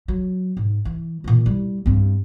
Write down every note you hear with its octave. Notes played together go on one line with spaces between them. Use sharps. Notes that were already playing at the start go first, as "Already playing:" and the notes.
F#3
G#2
E3
A#2 E3
G3 E4
G2 C4